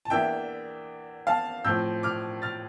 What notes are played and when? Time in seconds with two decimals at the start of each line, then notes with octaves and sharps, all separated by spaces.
0.05 A5
0.10 E2 E3 A#3 D4 E5 G5
1.27 F5 A5
1.65 A2 F3 C4 E6 G6
2.03 D6 F6
2.42 F6 A6